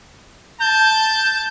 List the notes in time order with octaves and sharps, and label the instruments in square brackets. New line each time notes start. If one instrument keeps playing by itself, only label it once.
[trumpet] A5 [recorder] G6